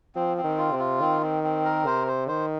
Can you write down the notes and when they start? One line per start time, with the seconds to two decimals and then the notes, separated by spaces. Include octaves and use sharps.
0.15 F3 C4
0.37 C4
0.44 D#3
0.58 F4
0.72 C3
0.79 F4
1.01 D#3 C4
1.22 C4
1.44 C4
1.65 A#4
1.86 C3 C5
2.07 C5
2.28 D#3 C5